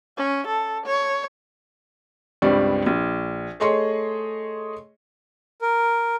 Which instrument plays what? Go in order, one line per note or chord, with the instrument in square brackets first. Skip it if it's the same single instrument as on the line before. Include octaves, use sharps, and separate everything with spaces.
[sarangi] C#4
A4
C#5
[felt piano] C#2 G2 G3 C4 D5 C#6
A#1
A3 G#4 C#5 D#5 C6 C#6
[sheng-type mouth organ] A#4